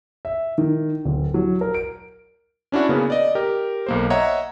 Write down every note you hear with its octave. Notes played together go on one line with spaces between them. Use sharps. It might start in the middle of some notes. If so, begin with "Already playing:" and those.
E5
D#3
D1
F#3
A#4
D7
C#4 D4 E4 F#4
C#3 A#3 B3 C#4
D5 D#5
G4 A#4
B1 A#3 C5
C#5 D#5 E5 F#5 A#5